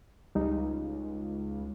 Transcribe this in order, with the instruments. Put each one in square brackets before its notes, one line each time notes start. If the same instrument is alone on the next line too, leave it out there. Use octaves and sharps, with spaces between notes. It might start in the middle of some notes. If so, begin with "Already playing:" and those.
[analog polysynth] C#2 [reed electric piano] G3 D#4